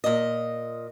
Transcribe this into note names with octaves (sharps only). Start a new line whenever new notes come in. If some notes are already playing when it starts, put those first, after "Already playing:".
A#2 D#5